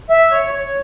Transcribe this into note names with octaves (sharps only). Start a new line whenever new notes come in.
E5
C#5
C#5